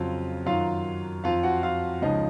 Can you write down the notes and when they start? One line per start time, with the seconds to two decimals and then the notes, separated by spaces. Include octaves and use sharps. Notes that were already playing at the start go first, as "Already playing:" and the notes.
Already playing: F2 C#3 F#3 F4 F5
0.46 F#2 D#3 F#3 F4 F5
1.24 F2 F3 F4 F5
1.43 F#4 F#5
1.63 F4 F5
2.02 C#2 C#3 F3 D#4 D#5